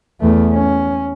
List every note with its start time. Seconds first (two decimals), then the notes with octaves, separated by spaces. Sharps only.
0.20 E2 A3
0.53 C#4